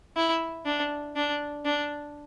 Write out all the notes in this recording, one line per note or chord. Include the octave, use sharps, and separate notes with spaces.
E4
D4
D4
D4